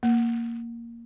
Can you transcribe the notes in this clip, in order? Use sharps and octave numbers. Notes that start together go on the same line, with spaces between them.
A#3